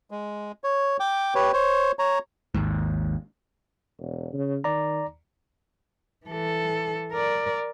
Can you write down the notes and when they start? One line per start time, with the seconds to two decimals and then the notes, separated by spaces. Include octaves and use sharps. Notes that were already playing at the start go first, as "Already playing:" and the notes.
0.11 G#3
0.64 C#5
1.00 G5 D6
1.35 G4 B4 C#5
1.53 C5 C#5
1.99 C#5 A#5
2.55 G#1 D#2 G#2
3.99 E1
4.33 C#3
4.64 D#3 D5 A#5
6.26 E3 A4
7.12 A#4 D5